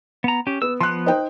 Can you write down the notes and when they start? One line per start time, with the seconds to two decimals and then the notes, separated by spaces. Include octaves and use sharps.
0.24 B3 A#5
0.47 C#4 G4
0.62 B3 E6
0.80 F3 B3 C6 F#6
1.06 D#4 C5 G5